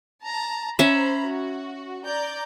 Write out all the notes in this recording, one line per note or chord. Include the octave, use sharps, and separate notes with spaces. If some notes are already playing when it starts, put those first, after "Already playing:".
A5 A#5
C#4 C5 E5 A#5 B5
F#4
D5 A#5 G6